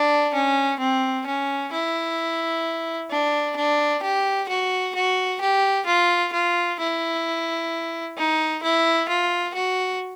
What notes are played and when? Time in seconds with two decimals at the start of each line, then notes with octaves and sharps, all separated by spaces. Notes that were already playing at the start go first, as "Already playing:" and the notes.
Already playing: D4
0.34 C#4
0.80 C4
1.27 C#4
1.73 E4
3.11 D4
3.56 D4
4.03 G4
4.49 F#4
4.95 F#4
5.41 G4
5.87 F4
6.33 F4
6.79 E4
8.17 D#4
8.63 E4
9.09 F4
9.55 F#4